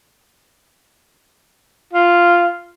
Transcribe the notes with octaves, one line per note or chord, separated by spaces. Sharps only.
F4